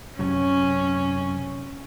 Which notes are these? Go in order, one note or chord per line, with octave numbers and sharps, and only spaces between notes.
F#2 C3 C#4 C#5